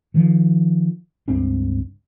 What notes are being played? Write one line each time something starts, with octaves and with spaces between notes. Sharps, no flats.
D#3 F3
C#2 G2 C4 D4